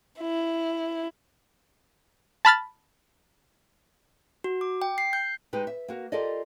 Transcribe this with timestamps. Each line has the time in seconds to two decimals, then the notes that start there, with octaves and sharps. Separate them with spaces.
0.19 E4
2.45 A5 B5 F6 A6
4.44 F#4
4.61 D6
4.82 G5
4.98 C7
5.13 G6
5.53 G#3 D#4 G4 B4
5.67 E5
5.88 A#3 F#4 A#4
6.12 F4 G4 A4 A#4 D5 D#5